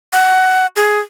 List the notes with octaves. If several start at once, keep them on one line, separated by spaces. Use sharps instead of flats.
F#5
G#4